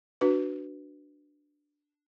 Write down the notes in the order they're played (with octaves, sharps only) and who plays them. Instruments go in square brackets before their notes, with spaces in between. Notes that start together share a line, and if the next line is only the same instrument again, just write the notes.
[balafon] D4 F#4 B4